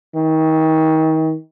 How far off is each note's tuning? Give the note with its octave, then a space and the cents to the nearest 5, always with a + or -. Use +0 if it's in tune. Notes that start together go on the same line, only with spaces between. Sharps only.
D#3 +35